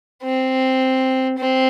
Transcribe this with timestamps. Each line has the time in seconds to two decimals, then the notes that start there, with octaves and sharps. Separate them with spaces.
0.23 C4
1.38 C4